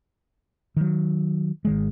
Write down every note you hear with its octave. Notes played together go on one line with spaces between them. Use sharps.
D#3 F#3
G#1 D#3 G#3